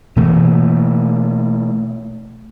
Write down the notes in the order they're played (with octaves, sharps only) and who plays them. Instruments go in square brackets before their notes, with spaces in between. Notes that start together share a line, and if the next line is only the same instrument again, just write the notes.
[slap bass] B2 E3 A3 A#3